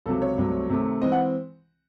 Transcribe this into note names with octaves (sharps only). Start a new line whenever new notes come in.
C#2 C3 F#3 A4
C#5
C2 C3 F#3 A3
C3 D#3 A3
E3 G#3 C4 D#5
F#5